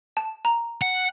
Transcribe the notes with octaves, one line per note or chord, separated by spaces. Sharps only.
A5
A#5
F#5